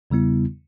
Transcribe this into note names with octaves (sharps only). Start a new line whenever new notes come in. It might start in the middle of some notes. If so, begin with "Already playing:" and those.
E2 C#3 G3 B3 E4